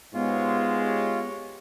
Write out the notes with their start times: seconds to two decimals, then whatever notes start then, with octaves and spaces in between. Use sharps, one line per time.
0.14 G#2 G#3 B3 F4 G4 C#5
0.82 G4 C#5